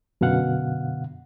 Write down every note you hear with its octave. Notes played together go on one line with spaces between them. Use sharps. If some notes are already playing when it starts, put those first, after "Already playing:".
F#2 B2 D3 F5 F#5